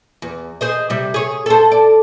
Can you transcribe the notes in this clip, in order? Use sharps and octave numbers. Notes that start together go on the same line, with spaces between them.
E2
G#4 C5 D#5
C3 G3
G#4 C#5
A4 C5
D5